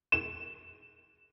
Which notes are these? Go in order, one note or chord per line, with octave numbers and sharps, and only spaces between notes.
E7